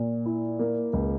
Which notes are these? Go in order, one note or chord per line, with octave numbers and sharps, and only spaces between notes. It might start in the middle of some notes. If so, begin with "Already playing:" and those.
Already playing: A#2 A#3
E4
A#3
C#2